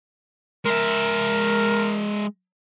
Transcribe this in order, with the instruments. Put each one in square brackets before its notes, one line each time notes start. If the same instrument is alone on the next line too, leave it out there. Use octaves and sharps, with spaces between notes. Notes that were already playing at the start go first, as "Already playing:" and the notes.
[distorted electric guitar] G#3 E5 [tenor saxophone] A#4